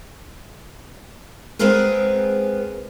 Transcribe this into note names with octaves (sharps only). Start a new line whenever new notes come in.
G#3 B3 C4 G#4 A#4 B4